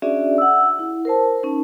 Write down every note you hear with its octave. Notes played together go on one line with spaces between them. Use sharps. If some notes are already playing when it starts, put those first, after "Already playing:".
C#4 D4 F#4 G#4 D5 E5
F#5 E6
E4
A#4 C5 A5
C#4 D#4